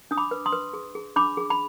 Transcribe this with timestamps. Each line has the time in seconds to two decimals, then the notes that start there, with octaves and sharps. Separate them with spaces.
0.11 D4 D#6
0.17 B5 D6
0.31 B4
0.46 C6 D#6
0.52 B4
0.73 G#4
0.95 G#4
1.16 D4 B5 D6
1.37 G#4
1.50 B5